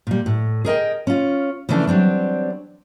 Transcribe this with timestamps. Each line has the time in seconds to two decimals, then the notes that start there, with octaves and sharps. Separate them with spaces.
0.07 A#2 G3
0.26 A2
0.65 G#4 A#4 D#5 G5
1.07 C#4 F4
1.69 C#3 E3 F3 A3 D4
1.87 F#3 G3 C4 D4